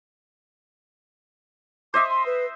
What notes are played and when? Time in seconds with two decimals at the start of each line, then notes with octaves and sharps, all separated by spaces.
1.94 C5 D#5 E5 D6
2.10 C6
2.26 B4